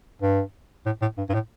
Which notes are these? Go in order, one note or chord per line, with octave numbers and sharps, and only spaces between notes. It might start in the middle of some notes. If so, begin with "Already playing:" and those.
G2
A2
A2
G2
G2
A2